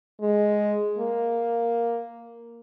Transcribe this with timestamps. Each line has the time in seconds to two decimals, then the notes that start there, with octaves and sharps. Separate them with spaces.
0.21 G#3
0.99 A#3